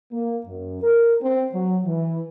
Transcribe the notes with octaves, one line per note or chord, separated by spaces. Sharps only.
A#3
F#2
A#4
C4
F#3
E3